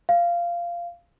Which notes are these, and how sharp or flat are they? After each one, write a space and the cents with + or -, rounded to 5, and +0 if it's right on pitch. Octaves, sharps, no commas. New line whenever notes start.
F5 -15